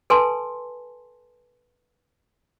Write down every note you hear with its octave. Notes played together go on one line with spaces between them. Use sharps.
A4 B4 G#5 A5 C6